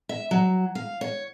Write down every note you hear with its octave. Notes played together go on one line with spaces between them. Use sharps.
E5
F#3
F5
C#5